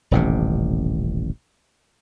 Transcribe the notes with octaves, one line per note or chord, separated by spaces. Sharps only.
D#1 A1 C3